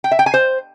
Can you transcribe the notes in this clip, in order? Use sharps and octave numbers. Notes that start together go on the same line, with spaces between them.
G5
E5
G5
G#5
C5